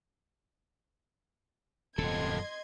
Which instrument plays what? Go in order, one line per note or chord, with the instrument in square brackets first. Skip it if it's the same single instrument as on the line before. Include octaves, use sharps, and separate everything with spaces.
[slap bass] D#1 C3 [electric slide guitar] F#2 A4 [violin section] D#5 C6 G#6